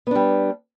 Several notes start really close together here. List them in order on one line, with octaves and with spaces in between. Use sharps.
B3 D4 G3